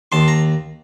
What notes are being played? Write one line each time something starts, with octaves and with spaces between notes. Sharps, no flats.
D#2 A5 C6
A#5